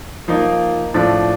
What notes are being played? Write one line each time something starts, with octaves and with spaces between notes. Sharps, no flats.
F3 A#3 D#4
A2 F3 A3 D4